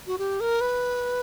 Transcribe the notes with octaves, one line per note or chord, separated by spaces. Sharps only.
F#4
G4
A#4
B4